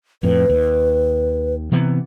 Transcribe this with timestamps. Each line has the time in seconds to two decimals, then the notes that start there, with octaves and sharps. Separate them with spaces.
0.23 F2 A2 B4
0.49 D#2
1.72 C3 E3 B3